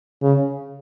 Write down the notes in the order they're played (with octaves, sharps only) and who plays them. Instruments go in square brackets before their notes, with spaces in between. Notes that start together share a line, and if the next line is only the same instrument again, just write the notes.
[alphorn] C#3